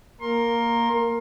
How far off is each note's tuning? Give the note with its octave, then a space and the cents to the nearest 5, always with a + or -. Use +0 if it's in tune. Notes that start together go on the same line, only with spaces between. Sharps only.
A#3 +0 A#4 +0 C6 +25